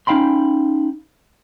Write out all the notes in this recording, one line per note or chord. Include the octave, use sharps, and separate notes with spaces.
C#4 D#4 F5 G5 B5 C6